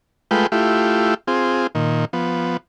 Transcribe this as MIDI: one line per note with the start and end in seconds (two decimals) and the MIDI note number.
0.31 0.47 56
0.31 0.47 57
0.31 0.47 65
0.31 0.47 71
0.31 0.47 79
0.52 1.14 57
0.52 1.14 64
0.52 1.14 65
0.52 1.14 67
1.28 1.67 60
1.28 1.67 65
1.28 1.67 68
1.75 2.05 46
1.75 2.05 51
2.13 2.57 53
2.13 2.57 59